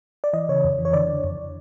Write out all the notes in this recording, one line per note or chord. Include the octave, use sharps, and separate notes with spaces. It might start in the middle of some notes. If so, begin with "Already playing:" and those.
D5
E3 D#5
C#3 C#5
F2
E3
C#5
D3 D5
D3
F2